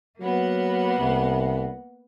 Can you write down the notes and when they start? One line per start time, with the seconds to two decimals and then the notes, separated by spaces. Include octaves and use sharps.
0.20 F#3 A#3 B3 F#5
0.97 C2